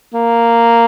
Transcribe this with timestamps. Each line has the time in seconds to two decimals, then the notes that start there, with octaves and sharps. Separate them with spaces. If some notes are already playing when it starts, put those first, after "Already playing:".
0.14 A#3